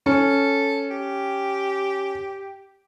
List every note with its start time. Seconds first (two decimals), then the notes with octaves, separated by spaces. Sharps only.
0.06 C#4 A4
0.91 G4